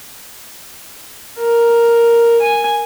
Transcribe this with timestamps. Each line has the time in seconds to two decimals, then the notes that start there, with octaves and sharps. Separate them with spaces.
1.39 A#4
2.42 G#5